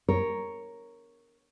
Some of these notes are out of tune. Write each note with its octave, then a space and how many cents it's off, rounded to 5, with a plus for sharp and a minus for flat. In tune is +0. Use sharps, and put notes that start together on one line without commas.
A#4 +0 C#5 +0